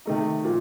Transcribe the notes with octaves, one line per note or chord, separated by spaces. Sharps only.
C3 D#3 A3 D#4
A#2 F3